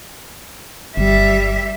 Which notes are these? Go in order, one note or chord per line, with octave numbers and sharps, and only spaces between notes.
G1 G3 E5